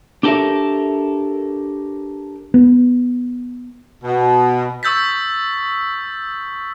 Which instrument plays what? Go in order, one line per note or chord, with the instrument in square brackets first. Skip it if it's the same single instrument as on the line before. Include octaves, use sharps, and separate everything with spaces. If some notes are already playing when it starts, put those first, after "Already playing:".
[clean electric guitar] D4 G4 A4 A#4 C#5 E5
[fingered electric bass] B3
[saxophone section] B2
[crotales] C#6 D#6 E6 G6 A6 B6